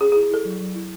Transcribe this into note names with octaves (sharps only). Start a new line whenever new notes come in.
C#4 G#4
G#4
E4
G#4
E4 A4
F#3
F#3
E4